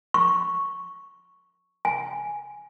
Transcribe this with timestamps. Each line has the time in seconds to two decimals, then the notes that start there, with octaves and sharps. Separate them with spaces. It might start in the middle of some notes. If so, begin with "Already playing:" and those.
0.14 C#6
1.85 G#5